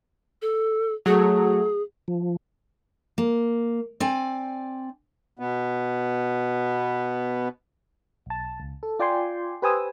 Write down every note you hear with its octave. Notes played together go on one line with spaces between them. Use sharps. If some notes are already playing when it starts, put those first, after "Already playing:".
A4
F#3 A3 G#4
F3
A#3
C4 D5 G#5
B2 B3
B1 A5
C#2
A4
F4 D5 G5 G#5 C6
G4 B4 C5 G#5 D#6 E6